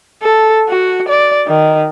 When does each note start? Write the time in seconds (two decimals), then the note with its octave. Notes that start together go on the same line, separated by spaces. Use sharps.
0.23 A4
0.69 F#4
1.08 D5
1.47 D#3